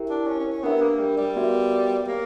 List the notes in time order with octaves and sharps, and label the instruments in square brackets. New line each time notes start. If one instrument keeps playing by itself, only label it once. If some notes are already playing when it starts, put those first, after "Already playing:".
Already playing: [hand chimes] E4 G4 A#4 E5 G5
[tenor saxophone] D4
C#4
C#4
C#4
[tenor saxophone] B3 [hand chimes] D4 G4 A#4 E5 G5
[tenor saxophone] A#3
G3
G3
[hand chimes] B3 F#4 A#4 E5
[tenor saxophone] A#3 [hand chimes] G4 C#5